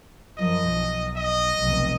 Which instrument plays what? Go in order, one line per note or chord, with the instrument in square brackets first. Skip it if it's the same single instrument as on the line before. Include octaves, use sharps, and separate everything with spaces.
[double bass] F#2 F3 [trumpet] D#5
[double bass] B1
[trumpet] D#5
[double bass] F1 B1